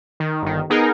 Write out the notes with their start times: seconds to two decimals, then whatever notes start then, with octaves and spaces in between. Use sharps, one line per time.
0.20 D#3
0.42 G1 D#3
0.70 B3 D#4 G#4 A#4